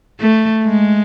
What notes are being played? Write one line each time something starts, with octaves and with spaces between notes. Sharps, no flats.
A3
G#3